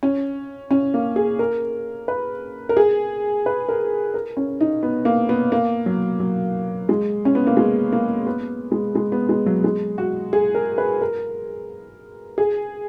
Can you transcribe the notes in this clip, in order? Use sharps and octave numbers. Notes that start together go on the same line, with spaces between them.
C#4
C#4
A#3
G#4
A#4
B4
A#4
G#4
B4
A#4
A#4
C#4
D#4
B3
A#3
B3
A#3
F#3
F#3
G#3
C#4
B3
A#3
G#3
A#3
B3
G#3
G#3
B3
G#3
F#3
G#3
F#4
G#4
A#4
B4
A#4
G#4